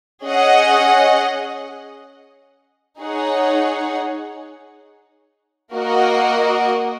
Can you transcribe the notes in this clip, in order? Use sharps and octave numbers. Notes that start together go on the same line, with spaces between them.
C#4 G#4 D#5 F#5
D#4 G#4 C#5 F#5
A#3 F#4 A#4 D#5 F#5